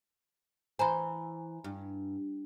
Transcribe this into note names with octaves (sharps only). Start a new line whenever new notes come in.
E3 C5 G#5 A#5 B5
G2